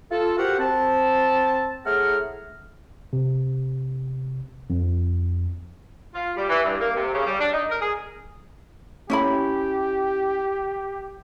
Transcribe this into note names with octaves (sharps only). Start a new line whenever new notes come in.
F4 A4
F#4 G4 A#4 C5 F#5
C4 A5
A2 A3 G#4 F#5 A#5 F6
C3
F2
F4
G3
E3
G2
A#3
C3
C#3
G3
D4
D#4
A#4
G#4
C#4 E4 G4 B5